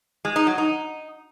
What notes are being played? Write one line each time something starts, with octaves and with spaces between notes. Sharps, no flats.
G#3
D#4
F#3
D#4